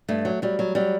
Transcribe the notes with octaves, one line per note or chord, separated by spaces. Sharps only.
G2 A3
F#3
F#3 G3
F#3
F#3 G3